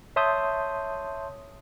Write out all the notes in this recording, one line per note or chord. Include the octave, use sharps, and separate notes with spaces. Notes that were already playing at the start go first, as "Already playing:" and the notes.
C#5 E5 A5 C6 D#6 G6